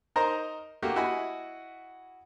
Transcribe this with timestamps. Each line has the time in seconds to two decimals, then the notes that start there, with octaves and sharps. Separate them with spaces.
0.16 D#4 A#4 C5 D#5 A#5
0.82 A3 A#3 F#4 G4
0.96 E4 F#4 D#5 G#5 B5